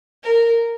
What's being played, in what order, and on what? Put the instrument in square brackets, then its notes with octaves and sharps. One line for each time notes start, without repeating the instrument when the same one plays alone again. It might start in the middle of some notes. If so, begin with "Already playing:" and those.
[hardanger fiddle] A#4